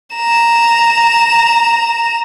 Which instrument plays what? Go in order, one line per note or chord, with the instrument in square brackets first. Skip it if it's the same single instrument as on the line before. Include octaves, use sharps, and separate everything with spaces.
[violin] A#5 E7